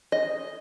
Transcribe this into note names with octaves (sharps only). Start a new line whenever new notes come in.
D#5